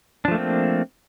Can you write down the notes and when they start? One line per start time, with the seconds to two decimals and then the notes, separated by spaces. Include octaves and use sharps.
0.25 D4
0.28 F3
0.31 A3
0.35 A#3
0.38 C4